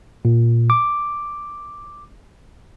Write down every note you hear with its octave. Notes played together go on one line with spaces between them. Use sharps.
A#2
D6